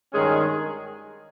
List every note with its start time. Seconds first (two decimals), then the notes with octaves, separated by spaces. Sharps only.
0.13 G2 D#3 G#3 C#4 G#4